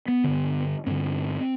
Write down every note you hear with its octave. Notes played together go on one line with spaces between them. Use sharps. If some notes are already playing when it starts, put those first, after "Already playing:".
B3
G2 D3
G2 D3 C4